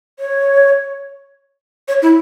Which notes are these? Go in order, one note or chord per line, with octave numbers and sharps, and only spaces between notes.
C#5
C#5
E4